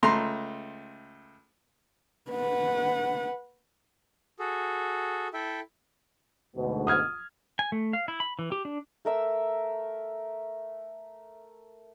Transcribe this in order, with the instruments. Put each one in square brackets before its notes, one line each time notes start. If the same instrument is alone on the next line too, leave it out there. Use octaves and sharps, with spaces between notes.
[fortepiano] C#2 A3 A#5 C6
[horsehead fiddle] B4 F#5
[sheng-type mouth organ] F#4 G#4 A4
E4 A4 E5 G5
[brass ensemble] D2 G#2 B2
[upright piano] D#6 F6 G#6
[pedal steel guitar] G#5
A3
F5
E4
B5
E3
G4
D4
[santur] A3 A#4 E5 E6